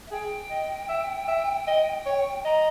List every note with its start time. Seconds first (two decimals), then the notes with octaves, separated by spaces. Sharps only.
0.06 E5
0.11 G#4 G5
0.50 D#5
0.89 E5
1.28 E5
1.68 D#5
2.06 C#5
2.44 D#5 A#5